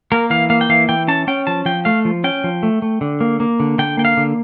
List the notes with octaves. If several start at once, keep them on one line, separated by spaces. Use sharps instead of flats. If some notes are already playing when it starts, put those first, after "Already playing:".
A#3 A#4
E3 F5
A#3 F5
G5
E3 F5
E3 G5
C#4 A5
C#4 G5
F3 A5
F3 G5
A3 F5
F3
C#4 G5
F3
A3
A3
D3
A#3
A#3
D3
D3 G5
A#3 G5
F5
D3